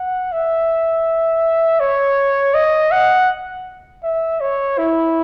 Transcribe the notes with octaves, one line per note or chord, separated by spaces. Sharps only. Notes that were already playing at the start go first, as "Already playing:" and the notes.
Already playing: F#5
E5
C#5
D#5
F#5
E5
C#5
E4